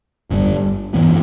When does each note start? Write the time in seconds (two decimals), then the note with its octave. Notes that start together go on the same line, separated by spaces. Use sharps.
0.30 G1 G2 G3
0.94 G2 E3 B3